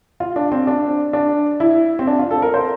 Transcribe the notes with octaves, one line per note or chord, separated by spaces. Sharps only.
F4
D4
C4
D4
D4
E4
C4
D4
F4
A4
A#4
C5